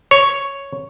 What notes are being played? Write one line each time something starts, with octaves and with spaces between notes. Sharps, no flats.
C#5